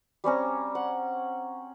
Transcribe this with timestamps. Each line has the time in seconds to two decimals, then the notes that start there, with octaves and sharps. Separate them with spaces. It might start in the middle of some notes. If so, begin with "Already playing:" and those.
0.24 G3 C4 C#4 A#5
0.75 F#5